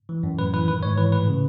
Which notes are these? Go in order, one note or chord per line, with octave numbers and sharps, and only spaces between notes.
E3
F#2
A2 B4
E3 B4
D#3 B4
G#2 C#5
E3 B4
A2 B4
C#3